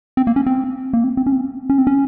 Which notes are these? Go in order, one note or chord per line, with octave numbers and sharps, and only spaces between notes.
C4
A#3
C#4
C4
A#3
C4
C4
C#4
C4
C#4
C4
C#4